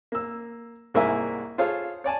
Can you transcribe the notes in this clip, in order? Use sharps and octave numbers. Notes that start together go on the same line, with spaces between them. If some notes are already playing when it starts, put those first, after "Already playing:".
A#3 E6
C2 G#2 A#3 E4 E5 G#5
F4 G#4 A4 C5 C#5 F5
C#5 D5 G#5 A5